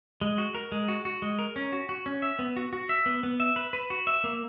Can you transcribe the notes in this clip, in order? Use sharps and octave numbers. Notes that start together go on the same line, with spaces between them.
G#3
F#4
A#4
G#3
F#4
F#4
G#3
A#4
C#4
F#4
F#4
C#4
E5
B3
F#4
F#4
E5
B3
B3
E5
B4
B4
F#4
E5
A#3